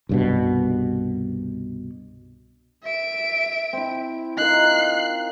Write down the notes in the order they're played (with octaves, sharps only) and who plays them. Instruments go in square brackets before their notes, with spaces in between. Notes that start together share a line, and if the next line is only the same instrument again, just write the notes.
[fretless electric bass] C2 G2 B2
[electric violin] E5 D7
[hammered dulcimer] C4 E4
[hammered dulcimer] D#4 F4 A#4 [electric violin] F#6 C7